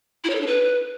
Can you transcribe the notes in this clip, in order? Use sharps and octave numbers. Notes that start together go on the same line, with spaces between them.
E4
C#5
A4
D4
B4